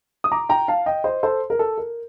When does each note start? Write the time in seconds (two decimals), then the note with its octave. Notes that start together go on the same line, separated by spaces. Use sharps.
0.24 D#6
0.32 A#5 D6
0.49 G5 A#5
0.68 F5 A5
0.86 D#5 G5
1.04 C5 D#5
1.23 A4 C5
1.50 A#4
1.59 A4
1.78 A#4